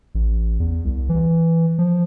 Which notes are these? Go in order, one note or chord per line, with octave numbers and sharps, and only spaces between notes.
A1
E2
C2
E3
F3